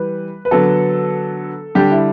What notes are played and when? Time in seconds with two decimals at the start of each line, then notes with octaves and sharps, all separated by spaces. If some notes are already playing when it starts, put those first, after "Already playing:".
Already playing: E3 G3 B4
0.45 B4
0.51 D3 F#3 B3 A4
1.75 D3 G3 D4 G4
1.91 E4